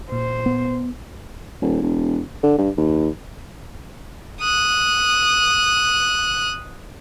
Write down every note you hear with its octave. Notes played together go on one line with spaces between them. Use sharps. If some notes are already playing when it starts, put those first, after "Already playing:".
A#2 C5
B3
D#1
E1
D3
G2
D#2
D#6 F#6